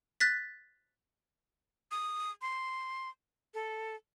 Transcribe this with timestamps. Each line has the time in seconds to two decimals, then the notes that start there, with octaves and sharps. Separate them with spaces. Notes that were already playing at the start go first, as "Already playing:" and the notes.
0.20 F#6 A6 B6
1.91 D#6
2.42 C6
3.54 A4